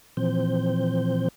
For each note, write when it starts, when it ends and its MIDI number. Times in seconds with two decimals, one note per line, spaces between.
0.17 1.29 46
0.17 1.29 52
0.17 1.29 53
0.17 1.29 60
0.17 1.29 72
0.17 1.29 91